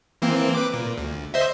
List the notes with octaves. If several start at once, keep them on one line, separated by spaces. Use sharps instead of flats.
E3 A#3 C4
B4 D6
A#2
D2
C5 D#5 E5